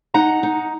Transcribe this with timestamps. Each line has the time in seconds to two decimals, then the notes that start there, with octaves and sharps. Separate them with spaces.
0.14 D#4 F#5 A#5
0.43 D#4